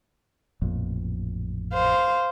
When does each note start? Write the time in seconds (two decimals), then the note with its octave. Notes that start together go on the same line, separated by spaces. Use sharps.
0.62 A1 F2 A#2
1.73 C5 F5